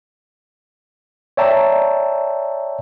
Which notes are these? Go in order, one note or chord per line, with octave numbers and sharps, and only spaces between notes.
C#5 D5 E5 G5 A5 A#5